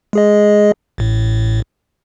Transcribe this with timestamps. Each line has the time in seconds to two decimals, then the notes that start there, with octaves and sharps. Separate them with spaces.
0.13 G#3 G#4 D#5
0.98 A1 A2